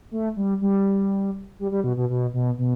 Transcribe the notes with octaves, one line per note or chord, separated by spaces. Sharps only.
A3
G3
G3
G3
G3
B2
B2
B2
B2
B2